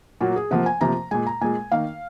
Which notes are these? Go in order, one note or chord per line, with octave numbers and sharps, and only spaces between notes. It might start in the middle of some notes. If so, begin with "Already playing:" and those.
A#2 F#3 A#3 F#4
G#4
C3 F3 A#3 F#5
G#5
C3 F3 A#3 A#5
A#2 G#3 G#5
A#5
A#2 G#3 G#5
D#3 A#3 F5